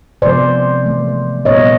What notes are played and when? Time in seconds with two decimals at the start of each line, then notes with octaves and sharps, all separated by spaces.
0.22 C3 F3 G#3 B3 C5 D5
0.84 E3 A3
1.45 A#2 G3 B3 C#5 D#5